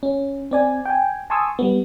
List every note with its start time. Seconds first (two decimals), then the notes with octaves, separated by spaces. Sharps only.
0.03 C#4
0.51 C4 D5 G#5
0.86 G5 G#5
1.30 G#5 A5 C6 C#6 D#6 E6
1.59 G3 B3